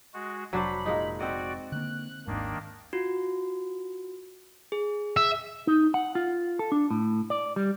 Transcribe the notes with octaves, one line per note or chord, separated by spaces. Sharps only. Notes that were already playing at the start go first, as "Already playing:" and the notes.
G#3 F#4
F1 F#3 D4 C5 B5
A#2 G#3 D#4
C4 F#4 D5 D#5 F#5
D3 A#3 F#6
G#1 D#2 G#2 D#3 A#3 D4
F4 F#4
G#4
E5
D#4
F#5
F4
A4
D4
A2
D5
G3